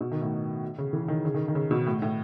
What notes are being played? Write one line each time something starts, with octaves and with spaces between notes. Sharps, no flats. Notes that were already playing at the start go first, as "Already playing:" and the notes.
B2
D#3
A2
C#3
E3
D#3
C#3
D#3
D#3
C#3
B2
A2
A2